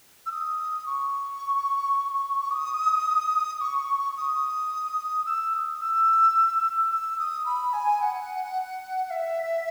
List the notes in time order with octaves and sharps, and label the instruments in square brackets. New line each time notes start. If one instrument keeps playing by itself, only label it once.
[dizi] E6
D#6
C#6
D#6
C#6
D#6
E6
D#6
D#6
E6
E6
D#6
B5
G#5
F#5
E5